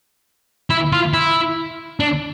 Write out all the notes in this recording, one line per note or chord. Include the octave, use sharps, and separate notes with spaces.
E4
F4
E4
D4